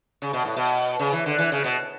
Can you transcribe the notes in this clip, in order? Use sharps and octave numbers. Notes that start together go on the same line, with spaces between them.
C#3
B2
A2
B2
C#3
E3
D3
E3
C#3
B2